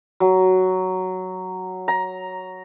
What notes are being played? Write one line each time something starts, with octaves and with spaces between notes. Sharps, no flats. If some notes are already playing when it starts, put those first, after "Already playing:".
F#3
A#5